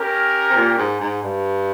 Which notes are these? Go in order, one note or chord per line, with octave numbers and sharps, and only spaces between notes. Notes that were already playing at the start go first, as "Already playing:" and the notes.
Already playing: C#4 G4 A#4
C3
A#2
G#2
G#2
G2